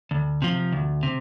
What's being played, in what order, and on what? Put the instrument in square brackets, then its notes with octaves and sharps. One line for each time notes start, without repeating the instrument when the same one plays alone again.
[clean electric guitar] D2
C3 F3
D2
C3